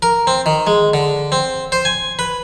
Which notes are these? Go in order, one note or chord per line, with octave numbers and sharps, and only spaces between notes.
A#4
C4
D#3
G#3
D3
C4
C5
G#5
B4